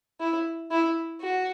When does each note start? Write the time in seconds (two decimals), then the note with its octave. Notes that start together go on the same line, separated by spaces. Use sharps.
0.20 E4
0.71 E4
1.22 F#4